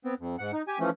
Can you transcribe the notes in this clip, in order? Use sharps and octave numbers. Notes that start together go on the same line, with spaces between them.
B3 C4
F2
G#2 F#5
D#4
G4 G#5
E3 F3 A3 C#4